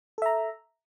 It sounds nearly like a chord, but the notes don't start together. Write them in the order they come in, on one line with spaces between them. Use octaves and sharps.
A4 E5 A#5